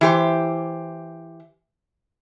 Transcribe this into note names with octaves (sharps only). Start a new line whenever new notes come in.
E3 G4 C5